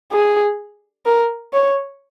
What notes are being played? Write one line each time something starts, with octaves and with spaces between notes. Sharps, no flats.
G#4
A#4
C#5